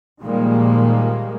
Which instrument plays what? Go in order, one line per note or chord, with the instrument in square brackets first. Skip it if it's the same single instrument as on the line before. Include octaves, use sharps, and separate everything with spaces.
[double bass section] A#2 D#3 F3 G3 G#3 A#3